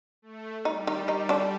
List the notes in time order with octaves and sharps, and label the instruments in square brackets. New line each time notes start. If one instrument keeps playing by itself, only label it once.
[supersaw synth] A3
[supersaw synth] G3 [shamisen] D#4
[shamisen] D#3 D#4
D#3 D#4
D3 D4